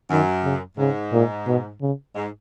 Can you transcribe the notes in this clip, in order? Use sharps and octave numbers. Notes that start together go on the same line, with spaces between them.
F#2 D#3
C#3
G#2 C#3
A#2
B2
C#3
G#2